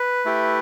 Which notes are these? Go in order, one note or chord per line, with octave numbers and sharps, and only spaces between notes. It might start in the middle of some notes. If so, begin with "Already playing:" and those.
Already playing: B4
A3 E4 G4